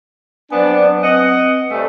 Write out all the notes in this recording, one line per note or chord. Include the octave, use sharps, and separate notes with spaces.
F#3 B3 C4 D4 F#5 G#5
C4 B4 D#5 F#5
G2 C3 A3 G#5